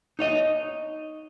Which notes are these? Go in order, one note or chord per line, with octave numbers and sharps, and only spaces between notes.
D#4 C#5 D#5